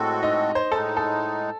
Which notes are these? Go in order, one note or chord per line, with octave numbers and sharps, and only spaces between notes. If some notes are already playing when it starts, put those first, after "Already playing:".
Already playing: A2 G#3 C4 F#4 A4
D#4 D#5
C5
A2 G#3 D#4 A4
A4